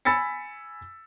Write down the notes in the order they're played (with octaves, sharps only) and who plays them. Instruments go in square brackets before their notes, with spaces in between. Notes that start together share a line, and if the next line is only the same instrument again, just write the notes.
[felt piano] G#5 B5 E6 A6 B6 C#7